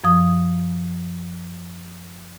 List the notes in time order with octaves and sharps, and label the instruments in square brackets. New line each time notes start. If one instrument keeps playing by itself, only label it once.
[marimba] F#2 F3 D#6